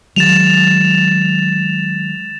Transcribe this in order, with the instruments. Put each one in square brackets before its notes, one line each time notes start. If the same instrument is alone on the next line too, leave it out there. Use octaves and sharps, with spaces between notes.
[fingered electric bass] D#3 F#3 G#3 [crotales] A6 E7 F7